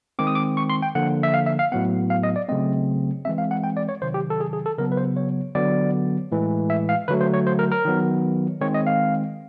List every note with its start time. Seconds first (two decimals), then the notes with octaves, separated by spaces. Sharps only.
0.19 D#3 G#3 C4 D6
0.27 D#6
0.35 D6
0.57 C#6
0.70 C6
0.82 G5
0.95 D3 F3 A#3 F#5
1.23 E5
1.34 F5
1.46 E5
1.59 F5
1.72 A2 F#3 B3 F#5
2.10 F5
2.23 D#5
2.36 D5
2.48 C#3 F#3 A3 C4 D#5
3.25 E3 G#3 C4 E5
3.38 F5
3.51 F#5
3.64 G5
3.77 D5
3.89 C#5
4.02 C3 D#3 F#3 C5
4.14 G4
4.30 A4
4.40 G#4
4.53 G#4
4.66 A4
4.78 C#3 F#3 B3 A#4
4.92 B4
4.97 C5
5.16 C#5
5.55 D3 F#3 B3 D5
6.32 A2 E3 G#3
6.70 E5
6.89 F5
7.08 D3 F#3 A3 B4
7.21 C5
7.34 C#5
7.47 C5
7.59 A#4
7.72 A#4
7.85 D#3 F#3 B3
8.61 D#3 G#3 C4 C#5
8.74 D#5
8.87 F5